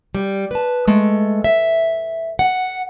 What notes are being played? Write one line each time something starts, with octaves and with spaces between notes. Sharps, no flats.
G3
B4 A5
G#3 A3
E5
F#5